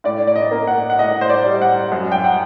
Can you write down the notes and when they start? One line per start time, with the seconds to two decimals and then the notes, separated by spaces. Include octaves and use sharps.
0.04 A2 D5
0.27 D5
0.36 D#5
0.51 A#3
0.67 F#5
0.90 F#5
0.99 A2 D#5
1.21 C5
1.29 D5
1.45 G3
1.62 F#5
1.92 F#2
2.12 G5
2.24 F#5